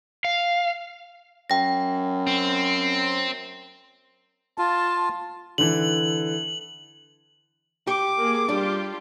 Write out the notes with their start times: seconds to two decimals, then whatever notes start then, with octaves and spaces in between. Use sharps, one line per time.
0.25 F5
1.50 F#2 G5 A#6
2.27 C4
4.58 F4 A5
5.58 D3 E3 F#7
7.87 G4 D6
8.17 A#3 G#4
8.49 G3 D4 F4 G4